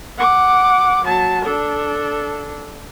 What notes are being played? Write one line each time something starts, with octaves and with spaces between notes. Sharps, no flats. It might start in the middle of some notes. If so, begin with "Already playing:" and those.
F#5 D6
F#3 A5
D4 A4